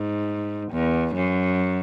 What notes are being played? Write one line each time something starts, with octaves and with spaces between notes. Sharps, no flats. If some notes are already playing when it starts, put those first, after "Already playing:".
Already playing: G#2
E2
F#2